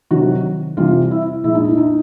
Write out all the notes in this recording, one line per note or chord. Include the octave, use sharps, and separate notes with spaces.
C3 D#3 F#3 F#4
C3 E3 G3 F4
E4
A#2 F3 G#3 E4
D#4
E4
D#4